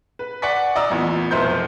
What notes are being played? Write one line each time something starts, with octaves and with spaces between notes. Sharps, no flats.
B4
D5 F#5 G#5 C#6 B6
D5 D#5 A#5 D#6 E6
A1 E2 A#2 E3
F1 B1 A#4 C5 E5 G6